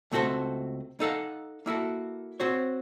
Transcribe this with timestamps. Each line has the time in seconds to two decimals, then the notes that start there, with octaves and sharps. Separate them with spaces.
0.12 C#2 A3 C4 F#4 A4 C5
1.00 D#4 A4 F5 F#5
1.66 A#3 E4 F#4 A4
2.40 C4 F#4 C5 C#5